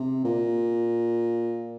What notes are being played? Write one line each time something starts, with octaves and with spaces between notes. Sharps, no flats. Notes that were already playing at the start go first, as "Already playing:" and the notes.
Already playing: C3
A#2